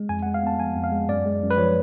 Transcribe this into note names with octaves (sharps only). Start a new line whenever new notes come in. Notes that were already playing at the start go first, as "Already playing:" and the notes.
Already playing: G#3
F2 G#5
F#5
G#3
F5
B3 A5
F3 G#5
F2
F5
G#3
F#2 D5
G#3
F#2
B4
F3 C#5